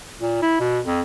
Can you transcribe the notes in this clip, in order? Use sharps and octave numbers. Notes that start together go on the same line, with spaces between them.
A#2
E4
B2
F2